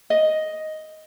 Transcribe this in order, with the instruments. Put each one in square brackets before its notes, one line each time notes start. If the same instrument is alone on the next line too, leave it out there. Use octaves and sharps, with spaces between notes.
[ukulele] D#5